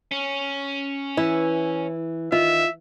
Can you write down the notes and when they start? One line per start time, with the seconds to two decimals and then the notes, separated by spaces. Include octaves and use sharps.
0.11 C#4
1.17 E3 E4
2.32 D#3 F4 E5